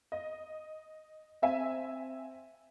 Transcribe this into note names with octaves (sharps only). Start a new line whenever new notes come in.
D#5
C4 E5 G#5